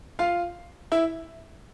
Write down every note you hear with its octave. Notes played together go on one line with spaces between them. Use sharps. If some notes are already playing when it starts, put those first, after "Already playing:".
F4 F5
E4 E5